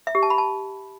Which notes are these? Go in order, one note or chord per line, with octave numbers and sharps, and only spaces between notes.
E5
G4
A5
B5
A5